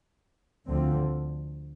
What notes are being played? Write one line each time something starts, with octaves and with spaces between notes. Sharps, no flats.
D2 D3 F3 C4